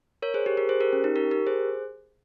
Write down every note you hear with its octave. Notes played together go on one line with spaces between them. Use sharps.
A#4 C#5
G#4 C5
G4 A#4
G4 A#4
G#4 C5
G4 A#4
C#4
D#4
G4 A#4
G4 A#4
G#4 C5